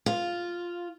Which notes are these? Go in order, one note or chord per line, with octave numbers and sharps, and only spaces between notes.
F4